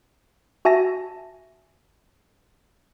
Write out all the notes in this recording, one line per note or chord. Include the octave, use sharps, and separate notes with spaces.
F#4 E5 G#5 A5 A#6